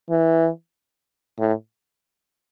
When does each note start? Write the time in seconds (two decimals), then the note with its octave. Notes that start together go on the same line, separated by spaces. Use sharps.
0.10 E3
1.39 A2